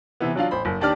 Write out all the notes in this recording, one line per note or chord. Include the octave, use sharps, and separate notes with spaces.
C3 E3 B3
F#3 D4 F4 F5
A1 C5 B5
F#1
D#2 D4 G4 D5 F6